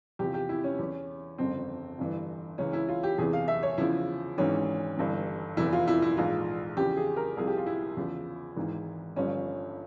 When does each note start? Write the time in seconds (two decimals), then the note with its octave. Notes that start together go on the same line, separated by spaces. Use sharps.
0.19 E2 C3 F3 G4
0.34 G4
0.49 E4
0.64 C#4
0.79 E2 E3
1.38 G1 F2 C#3 C4
1.98 G1 G2 E3
2.58 C#2 C#3 E3 C#4
2.73 E4
2.88 F4
3.03 G4
3.18 E2 C3 E3 G#4
3.33 F5
3.48 E5
3.63 C#5
3.78 E2 C#3 F3 E4
4.38 G#1 G#2 E3 C#4
4.97 G1 G2 E3
5.57 F1 E2 E3 E4
5.73 F4
5.88 E4
6.02 E4
6.17 A#1 G#2 E3 F4
6.77 E2 C#3 F3 G4
6.96 G#4
7.16 A#4
7.37 C2 C3 F3 G#4
7.47 G4
7.57 F4
7.66 E4
7.97 E2 C#3 F3
8.56 G#1 G#2 E3
9.16 G1 G2 F3 C#4